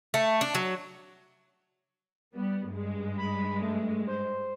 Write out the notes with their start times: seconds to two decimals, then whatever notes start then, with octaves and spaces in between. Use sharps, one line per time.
0.14 A3
0.41 D4
0.55 F#3
2.36 G3 B3
2.70 G2 G#3
3.18 B5
3.62 A3
4.07 C5